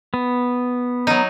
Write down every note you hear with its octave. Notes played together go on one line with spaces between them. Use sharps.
B3
F#3 D#4